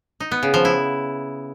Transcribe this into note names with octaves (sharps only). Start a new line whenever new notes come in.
D#4
B3
C#3
F3
E4